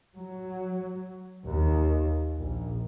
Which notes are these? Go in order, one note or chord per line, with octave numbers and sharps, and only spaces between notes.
F#3
D#2
A#1